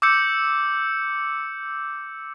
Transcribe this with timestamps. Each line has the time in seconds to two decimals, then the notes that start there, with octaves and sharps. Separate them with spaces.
0.02 D6 E6 G6 C#7